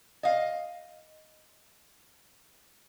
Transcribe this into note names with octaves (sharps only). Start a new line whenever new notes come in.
D#5 F5